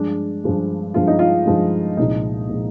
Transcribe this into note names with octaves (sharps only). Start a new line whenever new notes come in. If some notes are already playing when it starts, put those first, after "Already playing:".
Already playing: G2 F3 G#3 D4
G2 F3 G#3
G2 F3 G#3 F4
D#4
F4
G2 F3 G#3
C2 A#2 F3 G#3 D#4
A#2 F3 G#3